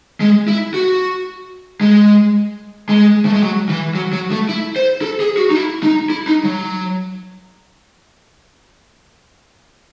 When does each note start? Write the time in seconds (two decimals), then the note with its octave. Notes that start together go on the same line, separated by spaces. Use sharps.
0.20 G#3
0.48 E4
0.74 F#4
1.81 G#3
2.89 G#3
3.25 A3
3.33 G#3
3.42 F#3
3.69 E3
3.95 F#3
4.13 F#3
4.32 A3
4.49 E4
4.76 C5
5.02 A4
5.20 G#4
5.37 F#4
5.51 D#4
5.55 E4
5.83 D#4
6.10 E4
6.28 D#4
6.45 F#3